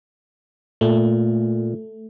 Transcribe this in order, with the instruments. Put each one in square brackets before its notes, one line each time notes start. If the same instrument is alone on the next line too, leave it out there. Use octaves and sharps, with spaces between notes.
[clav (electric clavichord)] A#2 [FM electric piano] A3